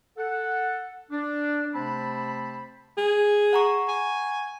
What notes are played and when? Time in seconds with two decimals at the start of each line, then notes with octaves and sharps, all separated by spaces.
0.17 A4 F#5
1.11 D4
1.74 C3 A3 C4 C5 A5 B5
2.98 G#4
3.53 F#5 A#5 C#6
3.88 G#5